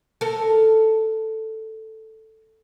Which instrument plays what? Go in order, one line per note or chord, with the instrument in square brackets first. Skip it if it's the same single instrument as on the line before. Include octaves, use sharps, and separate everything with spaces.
[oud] A4 A#4